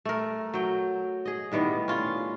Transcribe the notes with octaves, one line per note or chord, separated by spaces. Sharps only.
A3 A#4
F#3 G5
G#4 D#5
A2 D#3 G3 B3
C#4 F4